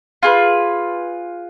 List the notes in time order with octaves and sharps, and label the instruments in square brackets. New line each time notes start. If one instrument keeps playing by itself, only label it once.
[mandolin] F4 G#4 B4